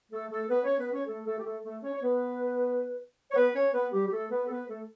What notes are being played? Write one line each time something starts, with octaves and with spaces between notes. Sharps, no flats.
A3 A4
A3 A4
B3 B4
C#4 C#5
B3 B4
C#4 C#5
A3 A4
A3 A4
G4
A3 A4
A3 A4
C#4 C#5
C#5
B3 B4
C#5
B3 B4
C#4 C#5
B3 B4
G3 G4
G4
A3 A4
B3 B4
A4
B3 B4
A3 A4